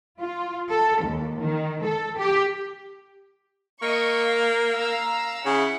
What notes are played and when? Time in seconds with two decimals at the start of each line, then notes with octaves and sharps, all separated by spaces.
0.20 F4
0.70 A4
1.05 D#2
1.42 D#3
1.85 A4
2.18 G4
3.82 A#3 D#5 C#6
4.24 F5
4.72 F5 A#5 E6
5.46 C#3 E4 F#5